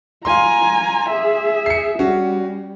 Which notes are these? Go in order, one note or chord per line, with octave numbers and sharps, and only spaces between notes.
F5 G#5 A#5 C6
G#4 E5
C7 C#7
G3 C#4 F#4